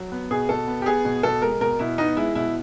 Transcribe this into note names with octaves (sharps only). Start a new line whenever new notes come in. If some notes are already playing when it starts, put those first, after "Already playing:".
Already playing: F#3
B3
B2 G#4
B2 A4
B3
G4
B3 G#4
B2
B2 A4
G#3 A#4
B2 A#4
B2 E4
B3 D#4
G#3 E4
B2 E4